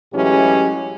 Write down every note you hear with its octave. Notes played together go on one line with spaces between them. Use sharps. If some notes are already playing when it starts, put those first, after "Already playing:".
A2 E3 F#3 G#3 C#4 G4